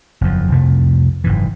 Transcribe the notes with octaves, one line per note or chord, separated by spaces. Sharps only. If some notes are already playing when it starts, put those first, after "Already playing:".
F#1 E2 F3
C2 F2 C3 A3
F#1 G#2 E3